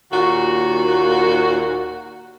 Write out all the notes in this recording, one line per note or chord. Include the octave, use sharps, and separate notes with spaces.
D#2 A#2 F#4